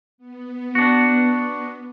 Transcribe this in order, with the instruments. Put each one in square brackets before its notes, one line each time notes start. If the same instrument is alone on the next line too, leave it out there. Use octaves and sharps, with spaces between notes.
[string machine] B3
[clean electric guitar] D4 F#4